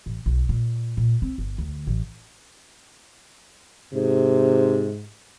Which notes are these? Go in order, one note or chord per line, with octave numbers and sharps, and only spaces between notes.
A1
B1
A#2
A#2
C4
G1
D2
A1
G#2 C3